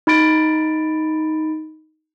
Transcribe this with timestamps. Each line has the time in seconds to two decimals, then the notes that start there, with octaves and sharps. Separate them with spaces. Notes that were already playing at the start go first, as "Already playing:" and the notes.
0.07 D#4 B5 A6 D7